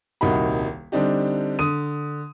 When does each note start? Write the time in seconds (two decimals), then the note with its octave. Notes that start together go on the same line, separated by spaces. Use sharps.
0.21 D#1 C2 A#3 D#4 F#4 B5
0.92 D3 G3 C4 D4 D#4 G4
1.59 D3 D#6 D#7